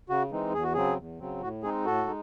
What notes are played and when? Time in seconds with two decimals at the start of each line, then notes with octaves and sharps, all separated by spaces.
0.09 C#3 F#4
0.31 E3 G#3 C4 D#4
0.54 E2 G#4
0.63 F#4
0.74 C#3 F#3 C4 G#4
0.97 E2
1.19 C#3 F#3 C4
1.41 A2 F#4
1.63 G#3 C4 D#4 G#4
1.85 A2 F#4 A4
2.07 G#3 D#4